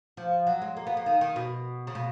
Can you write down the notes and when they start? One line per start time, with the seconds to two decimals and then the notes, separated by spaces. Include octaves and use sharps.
0.17 F3
0.47 F#3
0.62 G#3
0.77 A#3
0.87 B3
0.97 A#3
1.06 D#3
1.21 D#3
1.36 B2
1.87 C#3
1.95 B2